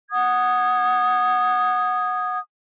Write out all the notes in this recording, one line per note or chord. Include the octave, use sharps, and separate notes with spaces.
F#5 D#6 G#6